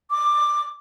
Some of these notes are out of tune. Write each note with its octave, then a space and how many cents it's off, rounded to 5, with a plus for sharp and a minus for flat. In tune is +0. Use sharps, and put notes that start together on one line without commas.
D6 +10